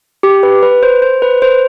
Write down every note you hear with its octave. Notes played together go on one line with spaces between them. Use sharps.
G4
B4
B4
C5
C5
B4
C5